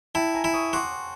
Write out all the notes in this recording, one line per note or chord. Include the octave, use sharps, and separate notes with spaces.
E4 G5 A5
G#5 A#5
E4
C#6 D#6
F#4 C6 D6